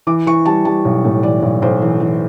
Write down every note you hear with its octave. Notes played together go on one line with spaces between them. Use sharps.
E3 D6
E3 C#6
G3 A5
G3 A5
B1
A2
E3 D5
B1
B1 C5
E3
E3